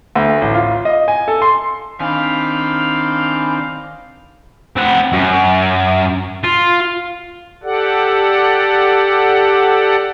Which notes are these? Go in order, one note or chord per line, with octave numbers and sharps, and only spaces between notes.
D2
A1
F4
D#5
G#5
A4
C6
D#3 C4 D4 F5 G#5 B5
C4 F#5
F#2
F4
G4 A4 D5 F#5